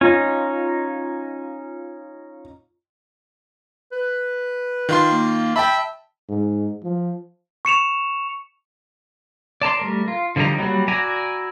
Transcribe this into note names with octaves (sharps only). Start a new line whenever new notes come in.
C#4 D#4 F4
B4
D#3 F4 C6
A#3
E5 G5 A5 B5
G#2
F3
C#6 C#7 E7 F7
D5 A5 A#5 C6
G3 A3 A#4
F4
D3 F3 G3 D#4 A#5
F#3 G3 A#3 F#4
E4 F#4 D5 G#5 A#5